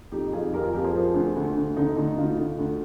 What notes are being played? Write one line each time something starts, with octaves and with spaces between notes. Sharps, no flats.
F2 D#4 G4
F2 F4 G#4
F2 G4 A#4
F4
F3 G4 A#4
G#4 C5
F3
D2
D2
D2
D3 D#4
D2 D#4
D2 F4
D3
D2